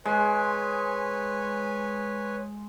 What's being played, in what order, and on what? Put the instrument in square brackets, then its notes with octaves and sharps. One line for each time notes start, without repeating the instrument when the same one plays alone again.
[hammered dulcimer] G#3 [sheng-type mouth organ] B4 C#5 G#5